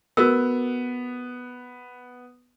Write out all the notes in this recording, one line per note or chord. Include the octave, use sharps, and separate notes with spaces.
B3 F#4 A#4 E6